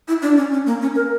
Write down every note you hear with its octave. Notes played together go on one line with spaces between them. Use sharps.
E4
D4
C#4
C#4
A#3
C#4
A#4